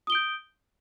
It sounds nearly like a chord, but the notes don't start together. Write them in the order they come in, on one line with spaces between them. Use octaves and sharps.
D#6 G7 D7 G6